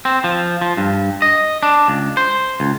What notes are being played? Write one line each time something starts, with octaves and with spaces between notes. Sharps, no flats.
C4
F3
F3
G2
D#5
D4
C#2
C5
C#2